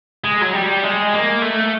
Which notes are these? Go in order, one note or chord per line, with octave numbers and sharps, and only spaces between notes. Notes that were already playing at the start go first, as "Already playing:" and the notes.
G#3
F#3
G3
G#3
A#3
A3